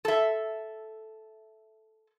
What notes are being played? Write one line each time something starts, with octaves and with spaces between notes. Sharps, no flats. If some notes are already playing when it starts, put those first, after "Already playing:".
A4 E5